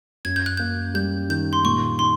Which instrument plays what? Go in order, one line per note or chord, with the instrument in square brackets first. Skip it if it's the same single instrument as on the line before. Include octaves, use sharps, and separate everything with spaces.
[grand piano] F#2 [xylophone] G#6
[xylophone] G6
F#6
[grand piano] A#3 [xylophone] G6
[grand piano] G3 [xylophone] G6
[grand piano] D#3 [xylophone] G6
[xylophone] C6
[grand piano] A#2 [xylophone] C#6
[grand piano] D#4 [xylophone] C6